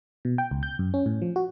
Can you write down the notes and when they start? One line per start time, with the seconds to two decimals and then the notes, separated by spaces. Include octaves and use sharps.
0.25 B2
0.38 G5
0.51 C#2
0.63 G6
0.79 F#2
0.94 C#4
1.06 A2
1.22 F3
1.36 F#4